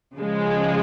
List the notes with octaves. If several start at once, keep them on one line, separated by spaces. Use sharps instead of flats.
C#3 F3 G#3